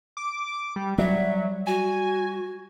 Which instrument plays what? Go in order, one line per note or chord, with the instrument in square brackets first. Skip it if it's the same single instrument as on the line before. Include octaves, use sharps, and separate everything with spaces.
[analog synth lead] D6
G3
[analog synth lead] F#3 [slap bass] G3 [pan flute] E5
[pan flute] F#4 [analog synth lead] G#5